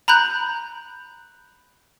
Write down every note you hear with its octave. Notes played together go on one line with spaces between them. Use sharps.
A#5 B5 F#6 G6